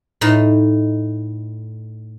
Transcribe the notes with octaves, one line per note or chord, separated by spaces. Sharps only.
A2 A3 D#4